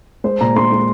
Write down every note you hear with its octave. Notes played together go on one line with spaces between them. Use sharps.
G#3 C5
A#2 A#5
G#3 C6
G#3